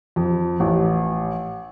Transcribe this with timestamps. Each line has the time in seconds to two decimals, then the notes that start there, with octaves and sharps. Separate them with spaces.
0.16 F2
0.60 A1